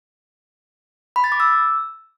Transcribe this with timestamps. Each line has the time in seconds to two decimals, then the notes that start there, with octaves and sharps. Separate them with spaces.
1.16 B5
1.24 A6
1.32 D6
1.40 E6